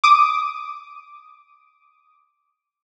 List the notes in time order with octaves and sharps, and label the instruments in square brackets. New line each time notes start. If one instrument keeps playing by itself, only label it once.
[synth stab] D6 D#6